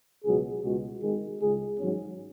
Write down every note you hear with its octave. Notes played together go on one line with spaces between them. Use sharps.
C#2 B2 F#3 G#4
C#2 B2 G#3 F#4
G#1 G#2 D#3 G#3 G#4
C#2 C#3 G#3 G#4
G#1 G#2 F#3 C#4